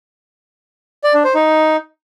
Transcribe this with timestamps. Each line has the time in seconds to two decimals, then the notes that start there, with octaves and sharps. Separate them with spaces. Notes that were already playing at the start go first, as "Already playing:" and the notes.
1.04 D5
1.14 D4
1.24 C5
1.35 D#4